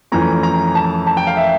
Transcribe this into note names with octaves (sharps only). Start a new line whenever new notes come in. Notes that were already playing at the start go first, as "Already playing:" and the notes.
F2 E3 A3 C#4 A#5
A#5
A5
A5
G5
F5
E5